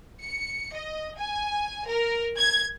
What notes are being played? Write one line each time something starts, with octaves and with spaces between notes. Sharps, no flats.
C#7
D#5
G#5
A#4
G#6